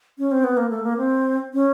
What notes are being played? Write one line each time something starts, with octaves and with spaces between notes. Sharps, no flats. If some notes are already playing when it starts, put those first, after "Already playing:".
C#4
C4
B3
A#3
A3
A#3
C4
C#4